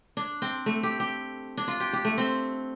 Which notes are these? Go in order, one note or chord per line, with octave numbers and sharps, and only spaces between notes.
D4
C4
A3
G4
G4
D4
F4
G4
G4
A3
C4